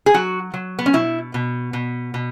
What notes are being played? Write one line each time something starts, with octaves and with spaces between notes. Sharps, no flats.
G#4
F#3 F#4
F#3
B3
C#4
B2 E4
B2
B2
B2